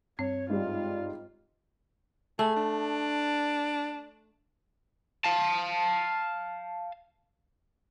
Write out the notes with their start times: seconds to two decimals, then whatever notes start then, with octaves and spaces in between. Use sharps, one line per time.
0.19 G2 C4 C#5
0.50 G#2 G3 F4
2.39 A3 G#4
2.56 D4
5.24 F5 A5